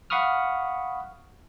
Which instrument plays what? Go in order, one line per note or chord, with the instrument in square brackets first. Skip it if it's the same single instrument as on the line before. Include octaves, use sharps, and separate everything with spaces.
[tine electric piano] F5 F#5 B5 C#6 D#6 F6